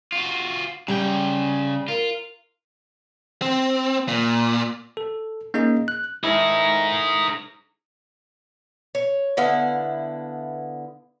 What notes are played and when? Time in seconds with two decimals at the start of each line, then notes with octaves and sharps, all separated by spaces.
0.12 F4 F#4
0.88 C#3 G3 G5 A#5
1.88 F4 A#4
3.42 C4
4.08 A#2
4.97 A4
5.54 A#3 C#4 D#4 G#4 D#5
5.88 F#6
6.24 A2 D#3 D#4 E4 G#4
8.95 C#5
9.37 D3 B3 E4 F5